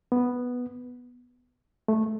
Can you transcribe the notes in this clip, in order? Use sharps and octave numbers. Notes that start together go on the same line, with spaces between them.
B3
A3